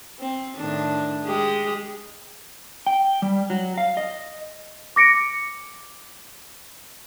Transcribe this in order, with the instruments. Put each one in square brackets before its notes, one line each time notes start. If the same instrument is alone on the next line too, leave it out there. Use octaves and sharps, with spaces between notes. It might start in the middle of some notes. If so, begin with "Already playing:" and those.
[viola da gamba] C4
A2 D#3 D4
G#3 G4 G#4
[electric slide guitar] G5
G3
F#3
F5
D#5
[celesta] D6 A#6 C#7 D7